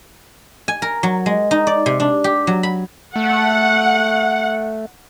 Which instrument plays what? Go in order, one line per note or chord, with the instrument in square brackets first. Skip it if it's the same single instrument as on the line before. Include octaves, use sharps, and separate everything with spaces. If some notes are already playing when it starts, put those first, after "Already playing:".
[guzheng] G#5
A#4
F#3
G#3
D#4
D5
C3
D4
G4
F#3
B5
[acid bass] A3 [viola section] F#5